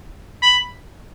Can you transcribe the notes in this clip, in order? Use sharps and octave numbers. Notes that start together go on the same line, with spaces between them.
B5